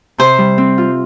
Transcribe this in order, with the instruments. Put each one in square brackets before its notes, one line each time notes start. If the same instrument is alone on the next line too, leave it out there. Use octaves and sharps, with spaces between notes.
[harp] C3 [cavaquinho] C5
[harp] G3
C4
F4